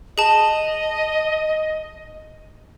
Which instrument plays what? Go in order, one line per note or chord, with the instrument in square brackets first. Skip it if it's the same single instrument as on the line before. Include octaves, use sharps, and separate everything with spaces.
[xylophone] G#4 A5 [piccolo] D#5